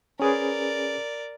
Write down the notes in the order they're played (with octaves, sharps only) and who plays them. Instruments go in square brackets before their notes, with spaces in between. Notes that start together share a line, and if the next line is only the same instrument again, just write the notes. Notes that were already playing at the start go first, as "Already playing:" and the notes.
[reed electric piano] C#4 G#4 B4 [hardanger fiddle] A#4 D5